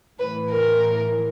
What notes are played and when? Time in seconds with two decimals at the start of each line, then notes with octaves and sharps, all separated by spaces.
0.19 A2 E3 B4
0.50 A#4